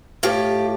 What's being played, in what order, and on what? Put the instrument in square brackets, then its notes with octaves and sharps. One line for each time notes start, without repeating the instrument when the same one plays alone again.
[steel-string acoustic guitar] A2 F4 G4